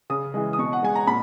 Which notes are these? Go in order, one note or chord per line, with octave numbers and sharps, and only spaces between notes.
C#3 D#6
E3 G#3
D#6
B2 C#6
F#5
G#3 G#5
A#5
A#2 B5